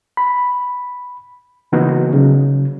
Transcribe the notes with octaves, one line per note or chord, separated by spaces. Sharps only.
B5
C#3 E3 A#3 B3 D#4 F#4
C#3 F#3